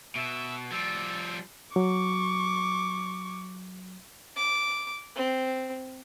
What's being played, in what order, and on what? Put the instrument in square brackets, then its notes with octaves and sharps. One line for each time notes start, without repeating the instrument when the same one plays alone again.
[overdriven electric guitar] B2 [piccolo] E5
[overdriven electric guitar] F3 G3 [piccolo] E6
[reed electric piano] F#3 [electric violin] C#6 D6
[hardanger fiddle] D6
C4